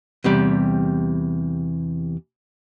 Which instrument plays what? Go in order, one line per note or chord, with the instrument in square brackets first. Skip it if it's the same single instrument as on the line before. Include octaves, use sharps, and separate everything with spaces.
[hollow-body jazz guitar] E2 C3 G3